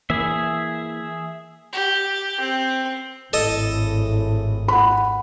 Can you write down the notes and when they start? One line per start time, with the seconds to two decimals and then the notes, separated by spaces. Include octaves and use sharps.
0.10 E3 A#3 G#4 E5
1.73 G4
2.40 C4
3.33 G#1 A2 A4 D#5
4.68 F#5 B5